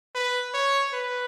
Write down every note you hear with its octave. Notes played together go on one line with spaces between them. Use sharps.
B4
C#5
B4